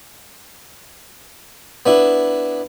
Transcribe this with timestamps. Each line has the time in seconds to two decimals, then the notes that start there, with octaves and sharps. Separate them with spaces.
1.86 B3 D4 E4